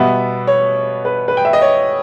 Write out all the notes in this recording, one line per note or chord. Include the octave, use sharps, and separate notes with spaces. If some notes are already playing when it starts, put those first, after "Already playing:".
Already playing: B2 G3 B3 E5
C#5
B4
B4
G5
E5
D#5
C#5